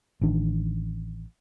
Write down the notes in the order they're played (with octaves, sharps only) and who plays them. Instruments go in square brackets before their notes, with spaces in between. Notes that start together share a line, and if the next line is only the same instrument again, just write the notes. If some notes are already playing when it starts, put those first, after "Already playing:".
[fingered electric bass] A1 D#3 D4